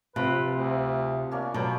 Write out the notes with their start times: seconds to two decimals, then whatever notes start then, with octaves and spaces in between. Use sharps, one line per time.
0.16 C3 F3 B4
0.53 D2
1.31 A#3 C#4 D4
1.54 B2 F#3 A3 C5 D5